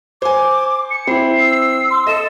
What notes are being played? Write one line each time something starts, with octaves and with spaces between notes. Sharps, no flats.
C5 G#5 D6
C#7
C4 E4 B5 C7
E6
C6
A4 D#5 E7